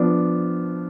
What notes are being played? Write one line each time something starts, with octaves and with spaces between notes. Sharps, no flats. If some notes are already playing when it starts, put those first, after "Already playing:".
Already playing: F3 B3 D4